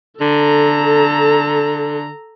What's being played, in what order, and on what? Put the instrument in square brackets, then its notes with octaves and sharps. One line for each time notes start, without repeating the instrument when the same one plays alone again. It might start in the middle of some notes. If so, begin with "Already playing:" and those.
[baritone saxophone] D3 [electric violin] A4 A#5